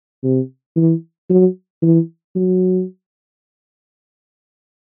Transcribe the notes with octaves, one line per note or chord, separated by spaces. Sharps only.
C3
E3
F#3
E3
F#3